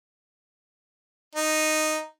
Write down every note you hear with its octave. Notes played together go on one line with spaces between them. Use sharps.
D#4